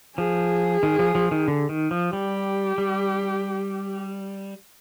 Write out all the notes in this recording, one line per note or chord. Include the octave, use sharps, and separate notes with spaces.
F3 G#4
D#3
F3
F3
D#3
D3
D#3
F3
G3 G4
G3